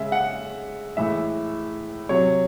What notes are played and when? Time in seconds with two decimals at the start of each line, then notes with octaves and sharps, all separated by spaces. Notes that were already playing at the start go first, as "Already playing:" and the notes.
Already playing: C#3 G#3 E5
0.12 F#5
0.97 A2 E3 G#3 E5
2.09 C3 F#3 C#5